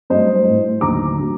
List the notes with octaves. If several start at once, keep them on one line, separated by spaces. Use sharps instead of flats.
G2 F#3 A3 C5 D#5
A2 A3
D#2 D3 F#3 A3 A#5 D6
D3 F#3 A3